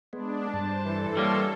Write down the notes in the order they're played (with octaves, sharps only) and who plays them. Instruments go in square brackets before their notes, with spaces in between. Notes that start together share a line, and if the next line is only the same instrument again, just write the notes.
[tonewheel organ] G#3 B3 [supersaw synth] D4
[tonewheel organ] G2 A5 [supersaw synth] C5
[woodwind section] E3 [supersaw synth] A4
[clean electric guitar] G3 A#3 [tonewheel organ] C#5 C6